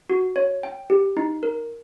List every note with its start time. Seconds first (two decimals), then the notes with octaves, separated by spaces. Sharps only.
0.10 F#4
0.36 C#5
0.63 G5
0.90 G4
1.17 D#4
1.43 A#4